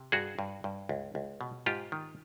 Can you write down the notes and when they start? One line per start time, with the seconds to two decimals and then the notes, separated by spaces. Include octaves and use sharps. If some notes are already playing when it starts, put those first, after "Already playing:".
Already playing: C3
0.12 G2 F#4 G#4
0.39 G2
0.64 G2
0.89 C#2
1.15 C#2
1.41 B2
1.66 G#2 F4 G4
1.92 D#3